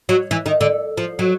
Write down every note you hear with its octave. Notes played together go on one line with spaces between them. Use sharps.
F#3
E3
D#3
D3
F3
F#3